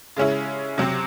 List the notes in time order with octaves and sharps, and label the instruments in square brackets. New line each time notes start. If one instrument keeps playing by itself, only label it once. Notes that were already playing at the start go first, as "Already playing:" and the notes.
[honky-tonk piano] C#3 G#3 C#4 E4
C3 F#3 C4